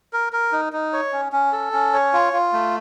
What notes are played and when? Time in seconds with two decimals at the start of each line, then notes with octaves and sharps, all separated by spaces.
0.13 A#4
0.33 A#4
0.52 D#4
0.73 D#4
0.93 C#5
1.13 C#4
1.32 C#4
1.53 A4
1.73 C#4
1.94 C#5
2.13 F4
2.33 F4
2.53 A3